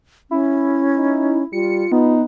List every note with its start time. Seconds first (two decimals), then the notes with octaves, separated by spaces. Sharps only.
0.31 C#4 E4
0.97 D#4
1.53 G3 F4 C#7
1.92 B3 D#4